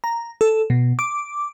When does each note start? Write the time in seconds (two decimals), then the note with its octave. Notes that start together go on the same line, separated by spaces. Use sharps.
0.04 A#5
0.41 A4
0.70 B2
0.99 D6